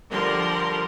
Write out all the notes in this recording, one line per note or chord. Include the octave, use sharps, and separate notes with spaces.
D3 F3 G3 A#4 C6